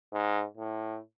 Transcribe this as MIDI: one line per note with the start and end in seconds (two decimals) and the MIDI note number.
0.12 0.45 44
0.57 0.98 45